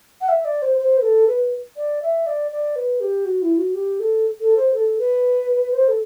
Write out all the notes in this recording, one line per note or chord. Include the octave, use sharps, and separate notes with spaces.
F#5
E5
D5
C5
C5
B4
A4
B4
D5
E5
D5
D5
B4
G4
F#4
E4
F#4
G4
A4
A4
C5
A4
B4
C5
A4